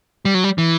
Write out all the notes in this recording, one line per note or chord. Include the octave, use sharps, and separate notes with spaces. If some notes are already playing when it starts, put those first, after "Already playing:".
G3
F#3
G3
E3